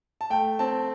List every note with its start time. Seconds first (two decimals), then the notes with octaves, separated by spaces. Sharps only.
0.21 A5
0.30 A3 G5
0.59 C4 A5